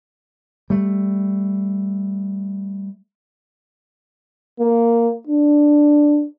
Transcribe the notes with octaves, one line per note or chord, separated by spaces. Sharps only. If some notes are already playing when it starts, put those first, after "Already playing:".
G3 A3
A#3
D4